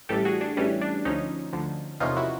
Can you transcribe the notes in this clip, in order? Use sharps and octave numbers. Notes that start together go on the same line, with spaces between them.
A1 A2 E3 G3 G4 A4
F#4 G#4
D4
A1 A2 E3 G3 C#4
D4
D2 D3 F3 C#4 D#4
D2 D3 F3
E2 C3 F3 A#3 C#4 D#4 F4
E4 F#4